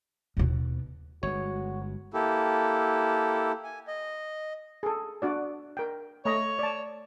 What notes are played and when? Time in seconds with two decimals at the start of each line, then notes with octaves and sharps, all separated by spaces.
0.37 D#2 B2
1.23 G1 G#3 F#4 C#5
2.14 A#3 E4 G4 A4
3.64 G#5
3.88 D#5
4.83 G#4 A4
5.22 D4 F#4 D5
5.77 A#4 G5
6.25 A3 C#5 D#5 A#5
6.59 D5 A5